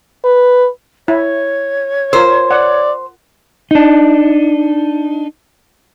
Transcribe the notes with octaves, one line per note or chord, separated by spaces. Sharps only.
B4
E4 C#5
F4 A#4 C5 E6
D5 F#5
D4 D#4